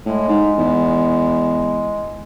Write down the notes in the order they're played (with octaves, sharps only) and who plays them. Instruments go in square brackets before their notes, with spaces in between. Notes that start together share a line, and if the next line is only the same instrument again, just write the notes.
[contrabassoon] A2 [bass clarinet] G#3
[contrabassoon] G#2
E2